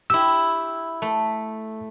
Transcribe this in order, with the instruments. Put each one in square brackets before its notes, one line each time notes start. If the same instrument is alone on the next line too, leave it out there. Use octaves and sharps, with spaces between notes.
[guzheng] E4 G4 [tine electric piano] E6
[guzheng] A3